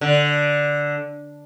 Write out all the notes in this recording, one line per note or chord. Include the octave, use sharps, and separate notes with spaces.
D3